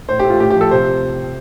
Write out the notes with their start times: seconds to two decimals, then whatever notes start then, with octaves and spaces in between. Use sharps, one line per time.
0.09 A2 C5
0.20 A3 G4
0.30 F4
0.40 A2 G4
0.50 F3 G4
0.61 A4
0.71 C3 C5